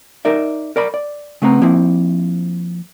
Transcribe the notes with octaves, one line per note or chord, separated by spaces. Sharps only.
D#4 A#4 D5 E5
A#4 D5 A#5 B5
D5
C#3 A3 B3 C4 A#5
F3 A#3 C4 E4